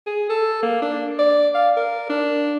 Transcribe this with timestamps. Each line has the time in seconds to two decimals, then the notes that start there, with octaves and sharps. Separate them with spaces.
0.07 G#4
0.30 A4
0.63 A#3
0.82 D4
1.19 D5
1.55 F5
1.77 A#4
2.10 D4